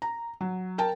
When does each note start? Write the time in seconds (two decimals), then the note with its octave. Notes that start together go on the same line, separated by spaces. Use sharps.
0.02 A#5
0.41 F#3
0.78 A#4 G5 A5